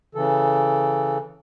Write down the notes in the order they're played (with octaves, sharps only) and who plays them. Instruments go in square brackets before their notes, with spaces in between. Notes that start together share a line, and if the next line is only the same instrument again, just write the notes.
[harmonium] C#3 E3 A4